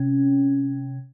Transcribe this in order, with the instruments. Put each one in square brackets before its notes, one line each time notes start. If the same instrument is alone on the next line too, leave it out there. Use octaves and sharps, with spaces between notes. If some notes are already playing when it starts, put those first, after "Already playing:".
Already playing: [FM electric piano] C3 C#4